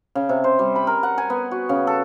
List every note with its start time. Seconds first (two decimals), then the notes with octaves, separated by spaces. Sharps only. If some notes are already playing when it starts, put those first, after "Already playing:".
0.15 C#3
0.29 C3
0.44 C5
0.59 G3
0.76 B5
0.87 A#4
1.03 F#5
1.18 G#5
1.30 B3
1.51 F#4
1.69 C#3
1.87 A4